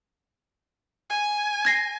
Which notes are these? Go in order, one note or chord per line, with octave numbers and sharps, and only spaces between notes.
G#5
G#6 A#6 C7